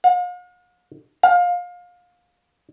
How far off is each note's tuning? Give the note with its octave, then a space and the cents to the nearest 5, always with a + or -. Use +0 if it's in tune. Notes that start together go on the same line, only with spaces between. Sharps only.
F5 +45
F5 +25